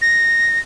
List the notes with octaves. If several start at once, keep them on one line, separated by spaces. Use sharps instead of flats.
A#6